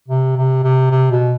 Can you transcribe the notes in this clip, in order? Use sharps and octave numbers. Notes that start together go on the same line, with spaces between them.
C3
C3
C3
C3
B2